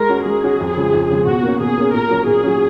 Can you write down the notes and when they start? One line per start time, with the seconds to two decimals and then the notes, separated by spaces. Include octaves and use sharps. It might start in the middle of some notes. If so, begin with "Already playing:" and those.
Already playing: G#3 A#4
0.09 C#4 F#4
0.26 G#3 G#4
0.43 C#4 F#4
0.60 F2
0.77 C#3 F3 G#3
0.94 F2
1.10 C#3 F3 G#3
1.26 B2 F#4
1.43 A#3 C#4
1.60 B2 G#4
1.77 A#3 C#4
1.94 A#2 A#4
2.10 F#3 C#4
2.27 A#2 G#4
2.43 F#3 C#4